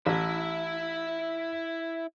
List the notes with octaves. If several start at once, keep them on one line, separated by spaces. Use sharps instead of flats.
A1 E4 E5